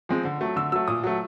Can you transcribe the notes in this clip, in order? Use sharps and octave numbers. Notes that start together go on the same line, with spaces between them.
F3 G#3 C4
D3
F#3 A3
D3 E6
F#3 A3 E6
A#2 D#6
F#3 A3